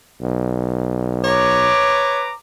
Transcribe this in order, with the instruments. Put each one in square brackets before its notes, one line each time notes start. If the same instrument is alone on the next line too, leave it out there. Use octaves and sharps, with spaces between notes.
[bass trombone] B1
[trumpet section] B4 A#5 D6 [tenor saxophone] C#5